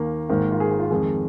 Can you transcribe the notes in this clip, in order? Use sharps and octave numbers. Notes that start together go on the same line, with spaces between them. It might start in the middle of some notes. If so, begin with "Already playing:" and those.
Already playing: D#2 D#3 A#3
G#1 G#2 D#3 A#3 A#4
F4
G#4
G#4
F4
F2 D#3 G#3 G#4